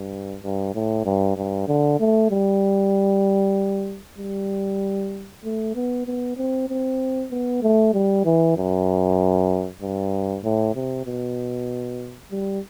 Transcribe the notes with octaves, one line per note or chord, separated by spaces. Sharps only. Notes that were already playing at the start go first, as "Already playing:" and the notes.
Already playing: G2
G2
A2
G2
G2
D3
A3
G3
G3
A3
B3
B3
C4
C4
B3
A3
G3
E3
F#2
G2
A2
C3
B2
G3